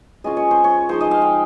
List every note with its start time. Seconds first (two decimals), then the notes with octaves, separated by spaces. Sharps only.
0.24 G#3 C#4 F4 D#5
0.37 C#5
0.51 C5
0.64 C#5
0.89 F3 G#3 D#4 C5
1.01 D#5
1.11 F5
1.22 G5